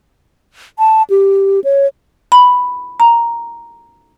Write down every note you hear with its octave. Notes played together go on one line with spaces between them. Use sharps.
A5
G4
C#5
B5
A#5